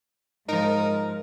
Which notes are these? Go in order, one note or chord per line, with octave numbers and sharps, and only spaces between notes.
G#2 F3 D#4 A#4